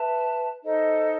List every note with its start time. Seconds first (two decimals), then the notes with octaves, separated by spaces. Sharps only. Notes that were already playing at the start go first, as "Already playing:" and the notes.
Already playing: B4 E5 A5
0.64 D#4 A4 C5 D#5